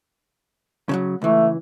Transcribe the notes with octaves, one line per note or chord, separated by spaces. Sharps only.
C#3 F3 F#3
C#2 E3 A3